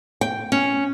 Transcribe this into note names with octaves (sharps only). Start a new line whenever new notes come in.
G5
C#4